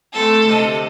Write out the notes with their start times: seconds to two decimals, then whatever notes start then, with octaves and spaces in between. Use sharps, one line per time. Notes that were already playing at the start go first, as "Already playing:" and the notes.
0.14 A3 C4 A4
0.44 D2 C3 D#5